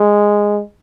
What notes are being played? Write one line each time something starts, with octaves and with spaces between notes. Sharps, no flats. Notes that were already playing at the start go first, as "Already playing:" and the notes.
Already playing: G#3